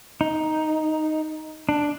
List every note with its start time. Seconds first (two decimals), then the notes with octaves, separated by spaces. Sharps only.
0.21 D#4
1.69 D4